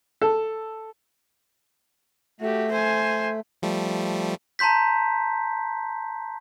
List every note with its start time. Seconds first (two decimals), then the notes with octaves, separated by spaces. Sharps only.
0.21 A4
2.41 A3 F#4 G4
2.72 C5 G#5
3.63 F3 G3 A3
4.59 A5 A#5 C6 G6 B6